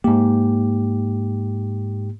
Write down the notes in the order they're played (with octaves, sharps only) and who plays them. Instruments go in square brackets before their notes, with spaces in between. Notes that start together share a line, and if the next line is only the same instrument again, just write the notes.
[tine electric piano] G#2 G4 [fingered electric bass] A#3